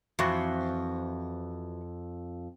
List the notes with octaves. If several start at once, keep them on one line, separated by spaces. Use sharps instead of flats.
F2 E3 F#4 C5